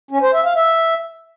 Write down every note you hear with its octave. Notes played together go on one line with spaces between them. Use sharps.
C#4
C5
E5
F5
E5